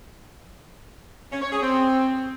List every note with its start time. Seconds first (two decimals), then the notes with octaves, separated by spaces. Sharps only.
1.31 C#4
1.41 C#5
1.51 G#4
1.61 C4